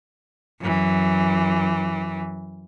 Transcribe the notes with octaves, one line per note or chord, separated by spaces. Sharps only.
F#2 E3